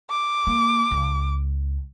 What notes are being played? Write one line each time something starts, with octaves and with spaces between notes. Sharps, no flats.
D6
A#3
C#2